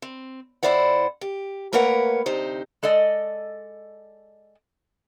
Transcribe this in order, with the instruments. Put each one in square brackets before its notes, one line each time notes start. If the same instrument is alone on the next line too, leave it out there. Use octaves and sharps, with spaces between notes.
[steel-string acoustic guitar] C4
F2 C3 E4 C5 D5 F#5
G4
A3 A#3 A#4 B4 C#5 F#5
D2 C3 D#4 C5
[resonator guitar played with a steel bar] G#3 A4 D5 D#5